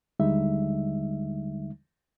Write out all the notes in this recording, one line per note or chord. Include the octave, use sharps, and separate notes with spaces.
D#2 D3 G3 G#3 D#4 E5